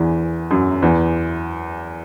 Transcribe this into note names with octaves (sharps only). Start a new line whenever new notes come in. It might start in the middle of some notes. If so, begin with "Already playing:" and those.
Already playing: E2 E3
F#2 F#3
E2 E3